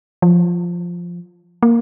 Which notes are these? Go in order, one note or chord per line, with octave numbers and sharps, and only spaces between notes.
F3
A#3